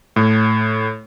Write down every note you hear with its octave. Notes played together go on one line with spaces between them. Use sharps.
A2